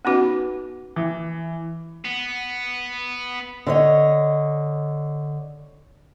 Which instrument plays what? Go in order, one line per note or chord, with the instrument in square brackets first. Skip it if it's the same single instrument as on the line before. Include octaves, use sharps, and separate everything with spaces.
[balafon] B3 C#4 D#4 F#4 B4
[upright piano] E3
[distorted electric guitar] B3
[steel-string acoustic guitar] D3 C#5 D#5